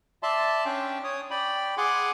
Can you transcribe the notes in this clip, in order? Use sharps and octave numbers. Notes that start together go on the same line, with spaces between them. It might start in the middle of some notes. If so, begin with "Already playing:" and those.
D5 E5 A5 C6
C#4 D4 G5
C#5 D#6
D5 G5 B5
G#4 F#5 G#5 C6 D6